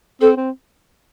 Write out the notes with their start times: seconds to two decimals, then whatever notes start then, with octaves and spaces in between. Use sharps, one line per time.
0.21 C4 A4
0.37 C4